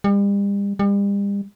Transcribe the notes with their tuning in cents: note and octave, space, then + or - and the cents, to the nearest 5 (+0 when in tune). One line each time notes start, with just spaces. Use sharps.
G3 +40
G3 +40